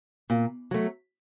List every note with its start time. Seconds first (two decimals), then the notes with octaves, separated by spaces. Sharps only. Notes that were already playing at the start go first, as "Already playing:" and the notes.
0.30 A#2
0.71 F#3 A3